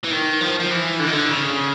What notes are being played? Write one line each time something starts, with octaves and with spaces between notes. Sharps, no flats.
E3
D#3
F3
F3
E3
D3
D#3
D3
C#3